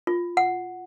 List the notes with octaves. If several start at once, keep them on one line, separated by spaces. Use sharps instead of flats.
F4
F#5